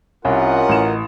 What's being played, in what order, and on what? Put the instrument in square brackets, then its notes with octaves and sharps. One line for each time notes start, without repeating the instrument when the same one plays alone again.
[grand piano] C2 [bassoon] C#4 [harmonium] F4 A#4 [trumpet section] G4 D#5 F#5
[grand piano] A1 E7